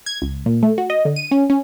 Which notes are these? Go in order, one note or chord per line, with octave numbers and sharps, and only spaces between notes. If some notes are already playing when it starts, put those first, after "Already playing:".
G#6
C#2
A#2
A3
F#4
D#5
D3
D#7
C#4
C#4